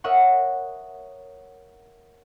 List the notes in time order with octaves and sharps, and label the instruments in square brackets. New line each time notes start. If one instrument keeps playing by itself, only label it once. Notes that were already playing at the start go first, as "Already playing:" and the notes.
[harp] A#4 C#5 D#5 E5 F#5 C#6